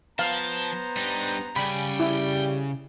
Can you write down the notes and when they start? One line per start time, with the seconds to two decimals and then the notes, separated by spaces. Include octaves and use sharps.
0.19 F3 B3 C5 F5 A5 A#5
0.97 G3 D4 D#4
1.56 C#3 G3 G5 G#5 B5
2.00 E4